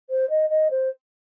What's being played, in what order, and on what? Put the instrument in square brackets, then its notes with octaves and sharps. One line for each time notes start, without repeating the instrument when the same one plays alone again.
[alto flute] C5
D#5
D#5
C5